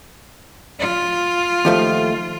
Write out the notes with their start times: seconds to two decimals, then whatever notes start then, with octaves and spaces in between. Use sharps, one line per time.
0.80 F4
1.65 D#2 F3 A3